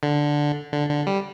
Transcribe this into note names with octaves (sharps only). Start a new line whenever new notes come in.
D3
D3
D3
G3